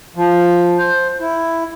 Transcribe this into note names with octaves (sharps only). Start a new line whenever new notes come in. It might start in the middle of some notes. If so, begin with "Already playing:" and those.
F3
C5
E4